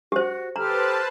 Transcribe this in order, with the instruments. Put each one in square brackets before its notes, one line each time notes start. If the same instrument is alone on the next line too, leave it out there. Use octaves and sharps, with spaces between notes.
[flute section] F#4 [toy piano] G4 C5
[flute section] G4 A4 F6 [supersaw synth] B4 C5 A5 [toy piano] A#5